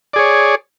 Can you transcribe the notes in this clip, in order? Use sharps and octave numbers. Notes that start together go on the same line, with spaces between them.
G#4 C#5 D5